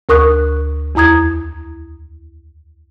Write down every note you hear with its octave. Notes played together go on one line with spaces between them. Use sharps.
D2 A#4 C#6 D#6 F#6
E2 E4 A#5 D#6 G#6